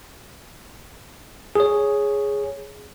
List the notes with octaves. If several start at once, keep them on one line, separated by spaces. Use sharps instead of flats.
G#4 C#5